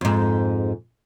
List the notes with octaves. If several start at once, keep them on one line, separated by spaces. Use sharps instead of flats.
F2 G#2